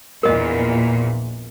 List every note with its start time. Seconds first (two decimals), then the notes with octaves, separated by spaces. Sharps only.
0.23 A#1 E2 A#2 A#4 D#5